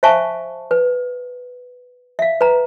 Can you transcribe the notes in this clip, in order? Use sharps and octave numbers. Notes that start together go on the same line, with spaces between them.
C5 E5 F5 G#5 A5 C#6
B4
E5 F5
B4 A#5